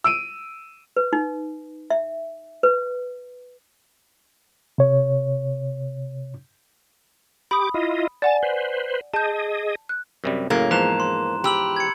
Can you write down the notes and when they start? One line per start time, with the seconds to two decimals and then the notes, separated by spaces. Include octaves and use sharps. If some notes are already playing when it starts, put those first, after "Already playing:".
0.04 E6 D7 D#7
0.97 B4
1.13 D#4
1.90 E5
2.63 B4
4.78 C3 C#5
7.51 G4 B5 D6 D#6
7.74 E4 F4 D#5
8.22 D5 F#5 G#5 A5
8.43 B4 C5
9.14 G#4 D#5 A5 G6
9.89 F#6
10.24 F#2 C3 G3
10.50 F#2 A2 C#3 A#3
10.71 E2 G#2 F3 A#5 F#6 E7
11.00 C6
11.44 G4 B5 E6 F#7
11.76 G#6 C#7